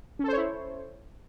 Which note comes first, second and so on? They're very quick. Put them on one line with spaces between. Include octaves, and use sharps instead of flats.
C#4 A4 C5 C#5 E4